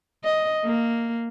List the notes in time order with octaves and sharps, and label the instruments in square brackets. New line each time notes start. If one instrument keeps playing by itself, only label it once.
[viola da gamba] D#5
A#3